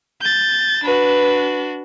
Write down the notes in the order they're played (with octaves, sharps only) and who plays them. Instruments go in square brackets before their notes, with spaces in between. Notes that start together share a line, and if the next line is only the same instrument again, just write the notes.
[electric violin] G6 A6
[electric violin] D4 F#4 [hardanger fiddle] B4